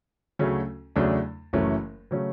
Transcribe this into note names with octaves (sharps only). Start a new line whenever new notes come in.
D2 C#3 F#3 A3 C#4
E2 C#3 F#3 A3 D4
F#1 F#2 E3 A3 C#4
C#3 F#3 A3 C#4